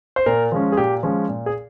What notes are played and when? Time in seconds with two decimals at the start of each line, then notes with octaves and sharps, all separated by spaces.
0.16 C5
0.26 A#2 A#4
0.52 F3 G#3 C#4
0.72 G#4
0.77 A#2 G4
1.03 F3 G#3 C#4
1.29 A#2
1.46 G#4